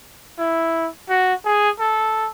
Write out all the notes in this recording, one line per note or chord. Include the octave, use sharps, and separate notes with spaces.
E4
F#4
G#4
A4